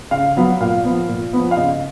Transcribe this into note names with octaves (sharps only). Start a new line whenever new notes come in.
C#3 F5
F#3 B3
A#2 F5
F3 B3
A#2
F3 B3
F5
C#3 D#5